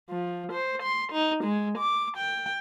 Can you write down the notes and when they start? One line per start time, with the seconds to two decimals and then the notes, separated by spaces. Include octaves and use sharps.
0.10 F3
0.52 C5
0.83 C6
1.12 D#4
1.44 G#3
1.78 D6
2.17 G5